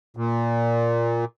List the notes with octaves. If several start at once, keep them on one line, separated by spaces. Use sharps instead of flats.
A#2